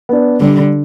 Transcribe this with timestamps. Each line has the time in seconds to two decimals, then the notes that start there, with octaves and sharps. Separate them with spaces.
0.09 B3 D4
0.40 D3 G3